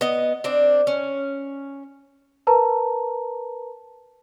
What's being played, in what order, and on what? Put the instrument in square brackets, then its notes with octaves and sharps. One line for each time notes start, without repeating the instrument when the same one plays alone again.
[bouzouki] B3 D#5
C4 D4
C#4
[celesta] A#4 B4 A5 A#5